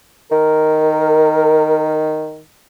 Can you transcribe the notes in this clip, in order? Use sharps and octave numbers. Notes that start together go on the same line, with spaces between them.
D#3 A#4